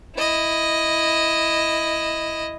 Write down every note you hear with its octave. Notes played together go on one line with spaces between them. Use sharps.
E4 D#5